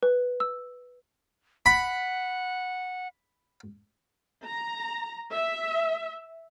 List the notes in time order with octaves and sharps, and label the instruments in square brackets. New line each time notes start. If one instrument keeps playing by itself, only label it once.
[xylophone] B4
E6
[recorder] F#5 [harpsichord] B5
[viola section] A#5
E5